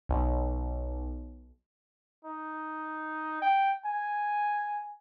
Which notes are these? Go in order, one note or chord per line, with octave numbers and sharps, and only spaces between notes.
B1
D#4
G5
G#5